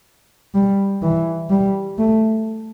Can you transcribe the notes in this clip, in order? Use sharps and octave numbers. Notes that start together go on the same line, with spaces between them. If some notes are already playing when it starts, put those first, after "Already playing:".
G3
E3
G3
A3